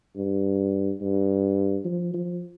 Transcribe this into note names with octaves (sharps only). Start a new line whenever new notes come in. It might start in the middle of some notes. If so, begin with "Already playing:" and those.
G2
G2
F3
F3